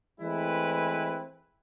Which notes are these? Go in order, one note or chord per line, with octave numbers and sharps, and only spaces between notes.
E3 G#3 A3 C4 E4 B4